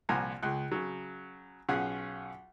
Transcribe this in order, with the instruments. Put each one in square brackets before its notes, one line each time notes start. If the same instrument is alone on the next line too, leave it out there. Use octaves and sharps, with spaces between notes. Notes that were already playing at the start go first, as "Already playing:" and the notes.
[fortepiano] C2 A#2 F3 F#5 G#5 A#5
C#2 G#4 F#6
C#3 F#3
B1 C#4 F4 G#4 F#5 G#5